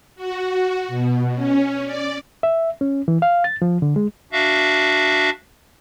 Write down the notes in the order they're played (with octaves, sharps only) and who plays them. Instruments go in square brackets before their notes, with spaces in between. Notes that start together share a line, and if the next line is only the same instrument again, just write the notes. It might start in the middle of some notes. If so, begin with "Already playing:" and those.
[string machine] F#4
B2
C#4
D5
[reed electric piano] E5
C#4
E3
F5
A6
F3
D3
G#3
[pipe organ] D4 F#4 E5 F5